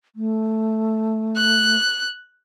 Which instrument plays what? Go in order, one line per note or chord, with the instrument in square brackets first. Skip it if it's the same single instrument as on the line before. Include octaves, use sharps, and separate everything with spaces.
[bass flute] A3
[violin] F#6